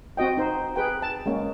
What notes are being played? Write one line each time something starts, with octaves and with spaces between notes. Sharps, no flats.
C4 F#4 D#5 G5
D#4 C5
G#4 B4 G5
A5
G#3 A#3 C#4